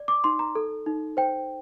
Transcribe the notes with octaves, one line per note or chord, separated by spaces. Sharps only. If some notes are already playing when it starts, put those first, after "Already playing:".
Already playing: D5
D6
D#4 C6
A#5
A4
D#4
C5 G5